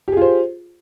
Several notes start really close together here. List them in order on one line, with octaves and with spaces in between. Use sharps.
G4 G#4 F4 C5